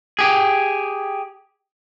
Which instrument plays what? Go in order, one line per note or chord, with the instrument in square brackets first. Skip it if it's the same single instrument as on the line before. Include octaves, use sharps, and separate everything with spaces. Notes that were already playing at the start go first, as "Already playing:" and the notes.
[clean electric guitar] G4 G#4